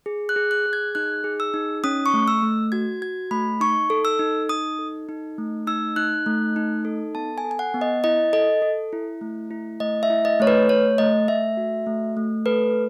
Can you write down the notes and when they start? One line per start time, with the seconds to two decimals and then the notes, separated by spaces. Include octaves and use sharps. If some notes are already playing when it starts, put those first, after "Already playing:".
0.06 G#4
0.29 F#6
0.36 G#4
0.51 F#6
0.66 G#4
0.73 G#6
0.95 D#4 F#6
1.24 G#4
1.40 E6
1.54 D#4
1.84 C#4 D#6
2.06 C#6
2.14 A3
2.28 E6
2.42 A3
2.72 F#4 G#6
3.02 F#4 G#6
3.31 A3 B5
3.60 D#4 C#6
3.90 A4
4.05 E6
4.19 D#4
4.49 D#4 D#6
4.79 A4
5.09 D#4
5.38 A3
5.67 D#4 E6
5.96 D#4 F#6
6.26 A3
6.56 D#4
6.85 A4
7.15 B3 A5
7.38 G#5
7.44 A4
7.51 G#5
7.59 F#5
7.74 B3
7.81 D#5
8.04 E4 D#5
8.33 A4 D#5
8.62 A4
8.93 E4
9.21 A3
9.51 E4
9.80 A3 D#5
10.03 E5
10.10 E4
10.25 D#5
10.40 A3 C#5
10.47 B4
10.69 A3 C#5
10.98 A3 D#5
11.28 A3 E5
11.57 F#4
11.86 A3
12.17 A3
12.46 A4 B4